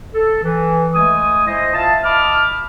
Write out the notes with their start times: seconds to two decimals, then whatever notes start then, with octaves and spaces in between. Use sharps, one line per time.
0.14 A4
0.43 E3
0.94 G#3 A3 G#5 D#6
1.47 E4 C5 D#5
1.74 A#2 E5 F5 A5
2.04 D#5 A5 B5 D6 F6